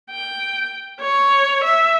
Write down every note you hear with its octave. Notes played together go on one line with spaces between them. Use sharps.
G5
C#5
E5